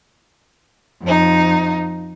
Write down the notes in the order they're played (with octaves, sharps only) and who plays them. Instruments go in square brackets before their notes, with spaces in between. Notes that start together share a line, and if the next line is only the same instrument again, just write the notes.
[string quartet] F2 D#4